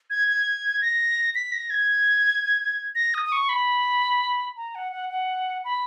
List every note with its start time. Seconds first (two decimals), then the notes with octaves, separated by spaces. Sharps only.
0.10 G#6
0.28 G#6
0.82 A#6
1.35 B6
1.52 A#6
1.70 G#6
2.95 A#6
3.14 D#6
3.25 D#6
3.32 C#6
3.49 B5
4.57 A#5
4.75 F#5
4.92 F#5
5.10 F#5
5.64 B5